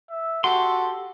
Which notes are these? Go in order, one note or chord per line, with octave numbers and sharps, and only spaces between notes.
E5
F#4 G4 A4 C6